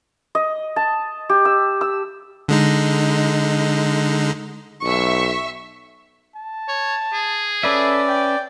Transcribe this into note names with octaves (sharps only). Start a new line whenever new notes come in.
D#5
A5
G4
E6
E6
D3 G#3 D#4
B1 E5 C#6
A5
C#5
G#4
C#4 A4 B4 D5 E5
G5